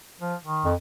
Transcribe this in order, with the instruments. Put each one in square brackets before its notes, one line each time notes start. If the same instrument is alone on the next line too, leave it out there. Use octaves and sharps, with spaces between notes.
[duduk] F3
D#3
[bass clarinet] F2